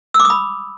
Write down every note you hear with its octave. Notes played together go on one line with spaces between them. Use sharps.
E6
D6
D#6
B5